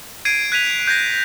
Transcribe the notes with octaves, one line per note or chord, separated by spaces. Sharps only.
G#6 C7 D7 D#7
F#6 G#6 B6 D#7 F7
G6 G#6 A#6 C7